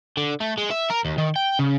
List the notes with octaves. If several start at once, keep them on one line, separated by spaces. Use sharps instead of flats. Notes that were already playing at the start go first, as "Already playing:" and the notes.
D3
A3
G#3
E5
A#4
D#2
D#3
G5
C#3